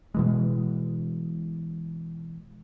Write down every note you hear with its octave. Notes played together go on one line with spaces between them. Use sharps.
B2 E3 G#3